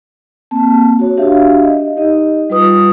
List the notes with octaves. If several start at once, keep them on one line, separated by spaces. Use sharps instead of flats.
A#3 C4 A5
F#4 C#5
D4 F#4 G4 E5 F5
D#5
D#4 G4 D#5
G3 F4 B4 D#6